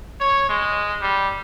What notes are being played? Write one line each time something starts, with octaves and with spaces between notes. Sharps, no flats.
C#5
G#3
G3